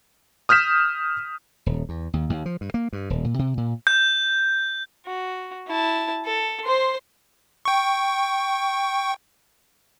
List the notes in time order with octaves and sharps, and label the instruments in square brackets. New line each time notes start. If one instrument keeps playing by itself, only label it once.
[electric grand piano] D#6 F6 G6 B6 E7
[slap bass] D#1
E2
D#2
D#2
F3
G2
A#3
G2
D#1
A#2
C3
A#2
[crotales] G6
[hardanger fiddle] F#4
E4 A5
A4
C5 C6
[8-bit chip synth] G5 C#6